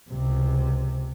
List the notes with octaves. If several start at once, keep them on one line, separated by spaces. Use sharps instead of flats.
C#2 C3